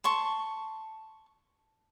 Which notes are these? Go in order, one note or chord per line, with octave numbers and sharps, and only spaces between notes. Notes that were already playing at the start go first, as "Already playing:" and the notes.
A5 C6 C#6